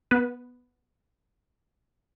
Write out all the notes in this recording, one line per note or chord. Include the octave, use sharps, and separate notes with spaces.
B3 B4